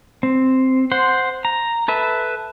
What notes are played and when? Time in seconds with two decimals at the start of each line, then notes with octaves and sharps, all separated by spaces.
0.23 C4
0.92 C5 F#5 C6
1.45 A#5
1.88 A4 B4 E5